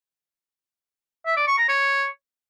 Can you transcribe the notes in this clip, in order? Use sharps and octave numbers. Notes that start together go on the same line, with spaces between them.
E5
D5
C#6
A#5
C#5